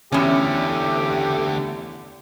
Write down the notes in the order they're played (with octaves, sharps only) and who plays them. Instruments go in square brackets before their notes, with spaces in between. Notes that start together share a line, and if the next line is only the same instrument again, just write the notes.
[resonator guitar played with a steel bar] E2 C#4 [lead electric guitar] D3 A3 [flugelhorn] G4